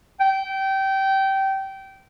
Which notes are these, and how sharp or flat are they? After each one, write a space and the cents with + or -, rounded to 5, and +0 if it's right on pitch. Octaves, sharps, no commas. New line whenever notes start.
G5 -20